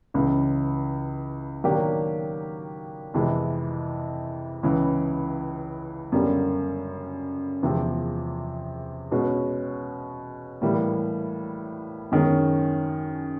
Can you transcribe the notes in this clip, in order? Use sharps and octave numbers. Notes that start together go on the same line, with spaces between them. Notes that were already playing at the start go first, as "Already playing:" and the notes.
C#2 C#3 E3
D#3 F#3 A#3 D4 G4
F2 C3 E3 G#3
C#2 C#3 E3
F#2 D3 G3 A#3
E2 C3 F3 G#3 C4
B2 G#3 C#4 F#4
A2 E3 G3 A#3
F#2 D#3 G#3 C#4